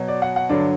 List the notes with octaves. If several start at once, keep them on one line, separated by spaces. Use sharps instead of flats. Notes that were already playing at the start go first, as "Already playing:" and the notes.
Already playing: B2 F#3
D5
F#5
F#5
G2 D3 F#3 D5